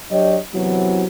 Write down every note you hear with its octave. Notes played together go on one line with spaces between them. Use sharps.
F#3 D4 G4 C#5 D#5
E2 C3 E3 F#3